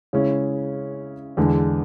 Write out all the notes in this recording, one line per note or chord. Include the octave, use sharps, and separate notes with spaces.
C#3 G#3 C#4 E4
E2 D3 G#3